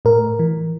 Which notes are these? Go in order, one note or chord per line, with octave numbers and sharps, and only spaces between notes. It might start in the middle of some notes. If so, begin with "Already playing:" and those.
A2 A#4
E3